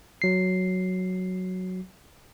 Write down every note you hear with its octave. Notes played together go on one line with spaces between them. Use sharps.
F#3 C7